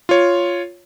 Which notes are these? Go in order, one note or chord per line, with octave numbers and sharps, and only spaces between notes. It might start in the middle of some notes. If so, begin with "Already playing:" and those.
F4 C#5